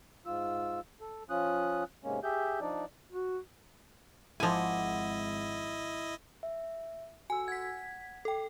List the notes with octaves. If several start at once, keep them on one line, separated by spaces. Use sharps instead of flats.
G#2 F4 E6
A4
F3 C#4 F4 D#6 F#6
G#2 C3 G#3 A#3 C#4
G4 G#4 E5 G6
F3 D4 D#4 D5
F#4
G#1 F3 E4 D#5 F#5 G#5 C6 D6
E5
F#4 A4 G#5 E6
F#5 G#6 B6
A4 G5